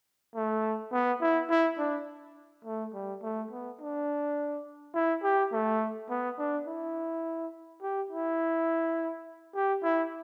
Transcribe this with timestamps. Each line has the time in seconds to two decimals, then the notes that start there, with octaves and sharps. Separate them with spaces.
0.35 A3
0.93 B3
1.21 E4
1.50 E4
1.79 D4
2.65 A3
2.94 G3
3.22 A3
3.51 B3
3.80 D4
4.94 E4
5.23 G4
5.52 A3
6.10 B3
6.38 D4
6.67 E4
7.82 G4
8.11 E4
9.55 G4
9.83 E4